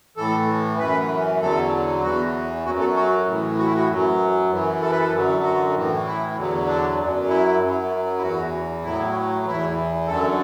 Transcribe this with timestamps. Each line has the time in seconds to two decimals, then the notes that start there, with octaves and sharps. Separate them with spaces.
0.17 A2 E3 A4
0.79 F#2 E3 B4
1.41 E2 D3 F#3 A4
2.03 E2 E3 F#4
2.65 F#2 F#3 F#4
2.80 A4
2.96 F#4
3.27 A2 E3
3.58 F#4
3.65 E4
3.74 F#4
3.88 F#2 F#3
4.51 F#2 E3
4.82 A4
4.92 B4
5.00 A4
5.13 F#2 D3 F#3
5.44 F#4
5.74 A2 E3
6.06 E4
6.37 E2 D3 F#3
6.67 D4
6.98 F#2 F#3
7.29 E4
7.60 F#2 F#3
8.18 E4
8.22 E2 E3 F#4
8.83 A2 F#3 E4
9.46 E2 E3 E4
10.07 F#2 D3 F#3 A4